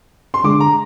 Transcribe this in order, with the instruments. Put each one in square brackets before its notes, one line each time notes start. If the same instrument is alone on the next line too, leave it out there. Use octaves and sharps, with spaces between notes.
[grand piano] C6
[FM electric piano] D3 G#3 D4 G#4 [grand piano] D6
[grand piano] A#5